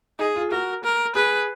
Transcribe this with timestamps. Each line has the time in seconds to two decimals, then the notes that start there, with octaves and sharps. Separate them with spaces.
0.19 D#4 G#4
0.36 F4
0.51 F#4 A#4
0.84 A#4
1.15 G#4 B4